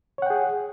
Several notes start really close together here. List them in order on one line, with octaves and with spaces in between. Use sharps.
C#5 F#5 G5 G#4